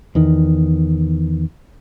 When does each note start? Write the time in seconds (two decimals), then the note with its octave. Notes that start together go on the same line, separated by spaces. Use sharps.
0.15 E2 D#3